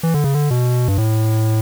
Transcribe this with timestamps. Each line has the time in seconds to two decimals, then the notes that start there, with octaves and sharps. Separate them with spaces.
0.03 E3
0.14 D3
0.24 C#3
0.34 D3
0.51 B2
0.88 G2
0.98 A2